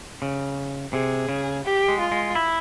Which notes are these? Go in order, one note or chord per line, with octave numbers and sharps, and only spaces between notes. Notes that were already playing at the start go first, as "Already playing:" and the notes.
C#3
C3 G#4
C#3
G4
G#3
F4
G#3
E4